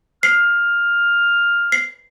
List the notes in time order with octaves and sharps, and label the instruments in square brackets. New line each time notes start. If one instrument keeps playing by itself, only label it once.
[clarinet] F6 [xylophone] C7
[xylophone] C7